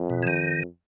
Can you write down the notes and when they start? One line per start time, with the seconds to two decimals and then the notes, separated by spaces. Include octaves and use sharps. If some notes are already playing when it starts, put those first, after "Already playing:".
Already playing: F2
0.10 B2
0.23 E3
0.27 D#3